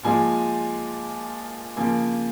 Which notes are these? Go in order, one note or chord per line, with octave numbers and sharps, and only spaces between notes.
A#2 F3 G#3 G#5
C#3 F3 A#3 G#5